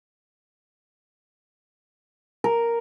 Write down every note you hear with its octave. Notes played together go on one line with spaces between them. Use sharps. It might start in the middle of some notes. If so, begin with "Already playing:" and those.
A#4